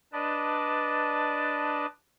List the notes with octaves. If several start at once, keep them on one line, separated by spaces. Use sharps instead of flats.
D4 B4 D5 D#5 A5